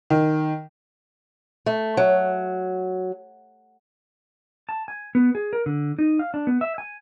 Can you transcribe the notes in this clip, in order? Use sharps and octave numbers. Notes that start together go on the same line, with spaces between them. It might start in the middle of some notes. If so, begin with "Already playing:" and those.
D#3
A3
F#3
A5
G#5
B3
G#4
A#4
D3
D#4
F5
D4
B3
E5
G#5